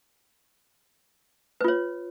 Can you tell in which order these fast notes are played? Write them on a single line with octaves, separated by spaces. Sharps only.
B4 F4 C#5